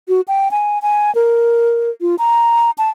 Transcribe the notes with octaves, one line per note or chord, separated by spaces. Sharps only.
F#4
G5
G#5
G#5
A#4
F4
A#5
A5